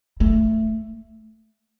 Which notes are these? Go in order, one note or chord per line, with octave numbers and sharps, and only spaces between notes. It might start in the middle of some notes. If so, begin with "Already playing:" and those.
A3